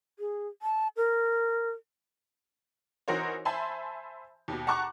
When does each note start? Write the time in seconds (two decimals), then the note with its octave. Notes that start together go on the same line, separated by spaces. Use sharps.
0.19 G#4
0.62 A5
0.97 A#4
3.08 E3 D#4 F#4 A#4 C5 C#5
3.45 C5 E5 G#5 A5 B5 C6
4.48 D#2 B2
4.67 F#5 A5 A#5 C#6 D6 F#6